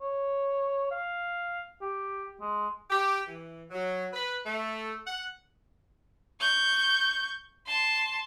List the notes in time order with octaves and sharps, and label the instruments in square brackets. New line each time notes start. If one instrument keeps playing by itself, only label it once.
[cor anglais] C#5
F5
G4
G#3
[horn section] G4
E3
F#3
B4
A3
F#5
[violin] C#6 G6
A5 C6